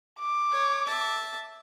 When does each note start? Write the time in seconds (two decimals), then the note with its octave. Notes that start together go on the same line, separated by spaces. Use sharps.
0.19 D6
0.52 C#5
0.87 E5 A5